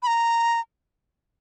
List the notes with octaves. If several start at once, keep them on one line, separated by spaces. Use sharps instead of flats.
B5
A#5